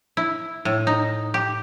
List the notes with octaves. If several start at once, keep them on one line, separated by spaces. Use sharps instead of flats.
E4
A2
D#4
G4